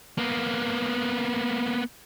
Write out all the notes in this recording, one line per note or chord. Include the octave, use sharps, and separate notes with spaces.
A#3 B3